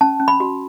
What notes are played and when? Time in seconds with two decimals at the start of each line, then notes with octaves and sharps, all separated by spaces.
0.01 C#4 A5
0.20 C#4
0.28 B5
0.40 F#4